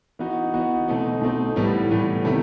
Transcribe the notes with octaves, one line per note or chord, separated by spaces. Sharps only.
E3 B3 D#4 F#4
E3 B3 D#4 F#4
B2 A3 C4 D#4
B2 A3 C4 D#4
A2 E3 G3 B3
A2 E3 G3 B3
C3 D#3 A3